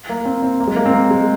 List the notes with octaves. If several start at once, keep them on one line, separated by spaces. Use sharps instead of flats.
A#3
C4
C4
A#3
G#3
A#3
C4
A#3
G#3